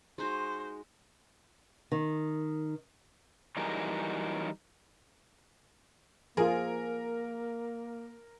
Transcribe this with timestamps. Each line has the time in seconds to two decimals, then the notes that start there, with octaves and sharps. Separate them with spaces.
0.18 G#3 D#4 F#4 C5
1.92 D#3
3.57 E3 F#3 G3 D#4 G#4 A#4
6.37 F3 A#3 F4 G#4 A#4